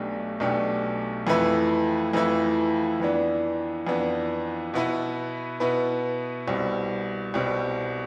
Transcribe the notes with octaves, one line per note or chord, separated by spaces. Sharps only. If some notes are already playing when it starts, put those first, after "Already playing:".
Already playing: B1 B2 A3 D4 G4
B1 B2 A3 D4 G4
F2 E3 A3 E4 B4
F2 E3 A3 E4 B4
F2 E3 B3 D4
F2 E3 B3 D4
B2 B3 E4 B4
B2 B3 E4 B4
C2 B2 G3 C4
C2 B2 G3 C4